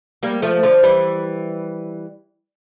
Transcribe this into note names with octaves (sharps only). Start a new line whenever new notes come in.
G3 A#3
F3 A3
D3 F3
E3 G3